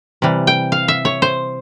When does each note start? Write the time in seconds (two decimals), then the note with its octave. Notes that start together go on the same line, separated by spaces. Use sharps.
0.22 C3 E3 G3
0.47 G5
0.72 F5
0.88 E5
1.05 C#5
1.22 C5